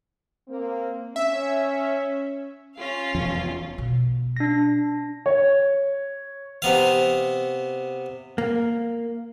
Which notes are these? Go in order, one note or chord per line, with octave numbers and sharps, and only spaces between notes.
A#3 C4
C#4 E5
C#4 F4 F5
F1 E2 F3
B2 B3
D4 A#6
C#5
C3 B3 F5
A#3